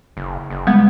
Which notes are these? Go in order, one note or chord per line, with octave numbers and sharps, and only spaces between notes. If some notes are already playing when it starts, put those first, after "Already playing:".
F#1
F#1
G3 G#3 B3